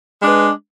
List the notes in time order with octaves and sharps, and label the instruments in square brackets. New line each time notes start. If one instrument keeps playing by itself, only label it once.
[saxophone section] G#3
D4
B4